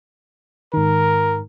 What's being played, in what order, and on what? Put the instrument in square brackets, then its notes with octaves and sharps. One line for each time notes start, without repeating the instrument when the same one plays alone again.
[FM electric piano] G#2 D#3 [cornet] A#4